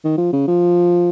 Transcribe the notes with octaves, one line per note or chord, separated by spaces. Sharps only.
D#3
F3
C#3
F3